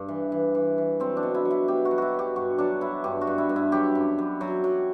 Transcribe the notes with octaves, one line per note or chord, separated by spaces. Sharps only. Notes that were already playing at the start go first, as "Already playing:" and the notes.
Already playing: G2
E3
E3
E3
E3
F#3 C4
D4
B2
E4
F#3
E4
B2 G4
F#4
F#3
E4 F#4
F#3 G4
G2 F#4
F#3 D4
F#3 E4
G2 G4
F#4
G2
E4
G2
E4
F#3 G4
F#2
F#2
F#3
F#3